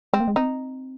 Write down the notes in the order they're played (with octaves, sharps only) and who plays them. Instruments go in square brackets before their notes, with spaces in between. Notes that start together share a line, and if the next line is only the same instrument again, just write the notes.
[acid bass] G#3 [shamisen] C4
[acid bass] A#3
G#3
[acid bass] C4 [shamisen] D#4